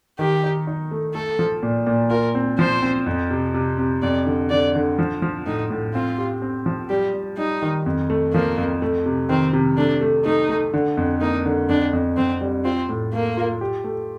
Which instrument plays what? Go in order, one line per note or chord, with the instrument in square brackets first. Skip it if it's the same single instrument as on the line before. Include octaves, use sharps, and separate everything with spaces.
[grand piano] D#3 [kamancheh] G4
[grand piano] D#4
D#4
A3
[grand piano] A3 [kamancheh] A4
[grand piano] F3
A#2
A#2
[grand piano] F4 [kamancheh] A#4
[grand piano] C4
[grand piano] F3 [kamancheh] C5
[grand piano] C4
F2
C3
C3
C3
[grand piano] F2 [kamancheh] D5
[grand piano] D3
[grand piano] D3 [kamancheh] D5
[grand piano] D3
F3
F3
[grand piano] A2 [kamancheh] D#4
[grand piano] A2
[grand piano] C4 [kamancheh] F4
[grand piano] G4
C4
F3
[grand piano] G3 [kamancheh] G4
[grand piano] G3
[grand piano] G3 [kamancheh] D#4
[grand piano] D#3
F2
A3
[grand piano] F3 [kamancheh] A#3
[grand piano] F2
A3
C3
[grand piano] D#3 [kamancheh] C4
[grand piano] C3
[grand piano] A3 [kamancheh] D4
[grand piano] A3
[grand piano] A3 [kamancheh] D#4
[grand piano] A3
D3
F2
[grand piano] A#3 [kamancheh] D#4
[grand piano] D3
[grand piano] F2 [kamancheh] D4
[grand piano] F2
[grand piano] F2 [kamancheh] C4
[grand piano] G3
[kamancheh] C4 [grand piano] F4
[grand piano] A2
[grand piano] A3 [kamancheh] A#3
[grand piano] F4
G4
A3